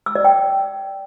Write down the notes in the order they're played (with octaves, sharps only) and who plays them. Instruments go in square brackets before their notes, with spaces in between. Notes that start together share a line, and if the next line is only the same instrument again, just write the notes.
[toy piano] E6
D5
G5